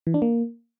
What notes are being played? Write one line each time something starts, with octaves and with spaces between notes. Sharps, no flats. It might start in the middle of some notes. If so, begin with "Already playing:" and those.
E3
D4
A#3